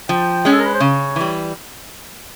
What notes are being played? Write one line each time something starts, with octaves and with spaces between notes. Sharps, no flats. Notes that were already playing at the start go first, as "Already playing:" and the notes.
F3 G5
G#3 C#4
A4
A#4
B4
C5
C#3 C#5
E3 G3